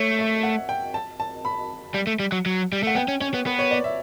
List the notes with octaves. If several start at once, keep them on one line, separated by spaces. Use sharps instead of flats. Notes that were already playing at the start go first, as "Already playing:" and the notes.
Already playing: A3 C#5
E5
F#5
G5
A5
A5
B5
G3
A3
G3
F#3
F#3
G3
A3 F#5
B3 G5
C#4
C#4 C#5
B3
B3 B4
C#5
D5
E5